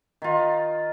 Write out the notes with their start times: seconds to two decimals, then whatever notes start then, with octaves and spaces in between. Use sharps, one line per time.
0.22 D#3 F4